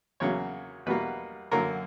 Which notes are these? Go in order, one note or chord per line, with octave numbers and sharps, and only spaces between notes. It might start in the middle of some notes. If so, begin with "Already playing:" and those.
E2 C#3 F#3 A#3 C#5
E2 B2 G3 A#3 B4
F#2 D3 F#3 A#3 A#4